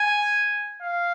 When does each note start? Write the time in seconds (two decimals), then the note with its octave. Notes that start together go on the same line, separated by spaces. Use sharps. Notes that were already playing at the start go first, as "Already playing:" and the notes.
Already playing: G#5
0.82 F5